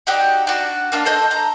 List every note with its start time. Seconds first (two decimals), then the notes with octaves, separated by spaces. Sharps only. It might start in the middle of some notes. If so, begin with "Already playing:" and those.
0.07 D#4 F#4 G4 D5
0.47 D4 F#4
0.92 A#3 D4 F4
1.06 A4 C5 D#5
1.31 A#5